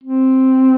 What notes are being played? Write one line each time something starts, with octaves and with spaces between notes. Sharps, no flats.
C4